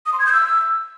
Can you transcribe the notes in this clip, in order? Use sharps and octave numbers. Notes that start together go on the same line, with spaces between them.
D#6
C6
G#6
G6
E6